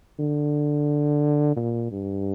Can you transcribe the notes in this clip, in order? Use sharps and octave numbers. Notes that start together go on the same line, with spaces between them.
D3
A#2
G2